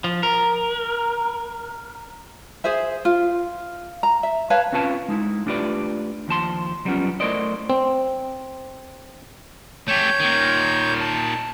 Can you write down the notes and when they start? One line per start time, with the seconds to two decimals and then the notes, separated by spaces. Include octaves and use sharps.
0.04 F3
0.23 A#4
2.64 G#4 C5 E5
3.05 F4
4.03 A#5
4.23 E5
4.50 B4 C#5 F5 A5
4.73 C4 C#4 F4 B4 A5
5.08 G#3 D#4 E4
5.46 A3 D4 F4 G4 B4 D5
6.28 D#2 F3 A5 C6
6.85 F#3 G3 A3 B3 C#4 F4
7.20 A3 E4 A#4 C5 D5 D#5
7.70 C4
9.88 A3 G4 C#5 G6
10.20 A#2 D#3
11.01 A5